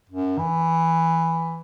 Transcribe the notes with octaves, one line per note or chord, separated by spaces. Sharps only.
F#2
E3